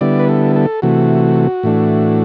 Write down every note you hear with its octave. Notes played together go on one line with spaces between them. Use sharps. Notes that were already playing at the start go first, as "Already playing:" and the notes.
D3 G3 B3 E4 D5
B4
A4
A4
C3 E3 A3 F#4
A2 E3 A3 D4